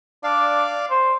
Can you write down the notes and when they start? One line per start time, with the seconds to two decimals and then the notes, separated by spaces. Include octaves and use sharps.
0.24 D4 D5 F5
0.91 C5